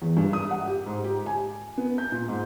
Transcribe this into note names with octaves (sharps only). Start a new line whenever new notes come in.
E2
G2
D#6
F#5
G4
G#2
G4
G#5
B3
G6
A#2
G#2